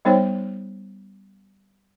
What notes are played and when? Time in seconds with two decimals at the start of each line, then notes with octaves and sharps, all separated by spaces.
0.05 G3 B3 D#4 C5 C#5 G5